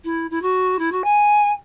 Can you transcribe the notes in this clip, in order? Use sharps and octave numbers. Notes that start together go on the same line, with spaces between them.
E4
E4
F#4
E4
F#4
G#5